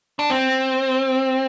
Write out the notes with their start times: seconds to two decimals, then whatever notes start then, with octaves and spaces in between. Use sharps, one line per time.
0.19 D4
0.30 C4